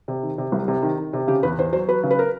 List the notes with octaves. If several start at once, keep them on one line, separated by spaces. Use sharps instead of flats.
C3
D#3
C3
C2
C3
D#3
D#3
C3
C#3 G4
E2 B4
E2 C5
F#3 C5
F#3 B4
C#3
B4
A#4